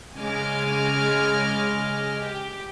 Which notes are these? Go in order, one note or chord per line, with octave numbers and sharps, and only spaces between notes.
C#3 G#3 D#5 G#5 D6 F6
G4